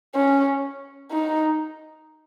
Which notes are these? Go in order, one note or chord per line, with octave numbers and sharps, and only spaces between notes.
C#4
D#4